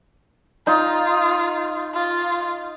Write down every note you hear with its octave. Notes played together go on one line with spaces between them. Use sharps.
D#4 F4
F4